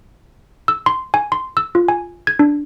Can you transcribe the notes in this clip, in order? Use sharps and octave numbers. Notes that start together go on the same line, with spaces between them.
E6
C6
G#5
C6
E6
F4
G#5
G#6
D4